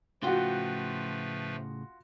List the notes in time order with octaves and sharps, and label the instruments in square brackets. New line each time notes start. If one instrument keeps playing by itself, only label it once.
[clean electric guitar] A2 C#3 G5 [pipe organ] F3 A3 B4 [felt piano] F4 F#4